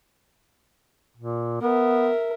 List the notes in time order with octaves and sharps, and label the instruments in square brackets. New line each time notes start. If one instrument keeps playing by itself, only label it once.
[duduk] A#2
[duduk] B3 [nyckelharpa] A#4 E5